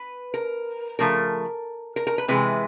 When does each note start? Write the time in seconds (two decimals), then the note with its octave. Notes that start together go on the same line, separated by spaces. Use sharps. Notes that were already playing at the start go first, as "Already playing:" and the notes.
Already playing: B4
0.34 A#4
0.99 C#3 F3 A3 A#4
1.96 A#4
2.07 A#4
2.18 B4
2.28 C3 E3 G#3 B4